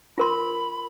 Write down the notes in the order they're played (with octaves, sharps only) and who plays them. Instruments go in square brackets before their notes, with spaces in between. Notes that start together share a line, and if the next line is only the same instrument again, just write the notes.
[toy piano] F4 A#4 C6 [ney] B5